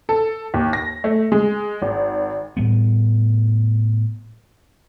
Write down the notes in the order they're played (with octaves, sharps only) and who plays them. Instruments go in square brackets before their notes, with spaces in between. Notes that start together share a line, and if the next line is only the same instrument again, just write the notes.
[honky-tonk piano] A4
D#2
A#6
A3
G#3
G#1
[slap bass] A2 G3 B3